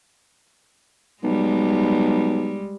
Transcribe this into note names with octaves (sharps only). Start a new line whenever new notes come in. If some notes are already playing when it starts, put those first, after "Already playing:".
B1 G3 G#3